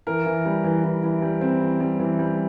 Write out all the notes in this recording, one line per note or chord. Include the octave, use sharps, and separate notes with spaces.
E3 A#4
E3
G3
E3
E3
E3
G3
C4
E3
G3
E3
G3